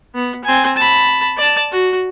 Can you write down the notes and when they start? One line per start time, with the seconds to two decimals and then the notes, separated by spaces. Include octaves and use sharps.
0.15 B3
0.44 C4 G#5
0.76 A5 B5
1.37 D5 A5
1.72 F#4